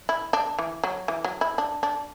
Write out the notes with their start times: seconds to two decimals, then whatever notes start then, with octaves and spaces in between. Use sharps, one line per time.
0.09 E4
0.33 D4
0.59 E3
0.84 F#3
1.08 E3
1.24 F#3
1.41 E4
1.58 D4
1.83 D4